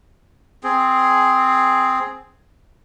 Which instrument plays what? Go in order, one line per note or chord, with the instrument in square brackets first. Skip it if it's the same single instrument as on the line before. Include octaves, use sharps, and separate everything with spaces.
[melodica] C4 G#4